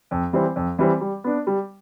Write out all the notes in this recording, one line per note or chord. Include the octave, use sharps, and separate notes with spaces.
F2
E3 G3 C4
F2
E3 G3 C4
G3
B3 D4
G3